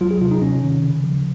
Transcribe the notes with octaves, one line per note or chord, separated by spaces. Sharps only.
F#3 F4
G#4
C3 F4
D#4
C3 C#4
D#3
C#3
F3